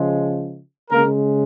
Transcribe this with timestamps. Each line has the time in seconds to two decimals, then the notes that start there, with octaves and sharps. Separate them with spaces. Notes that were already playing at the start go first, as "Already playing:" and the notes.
Already playing: C#3 F3 G#3
0.91 C#3 G#3 A#3 A#4